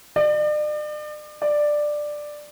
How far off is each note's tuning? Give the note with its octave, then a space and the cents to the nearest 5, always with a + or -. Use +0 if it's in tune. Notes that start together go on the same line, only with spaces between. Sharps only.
D5 +40
D5 +10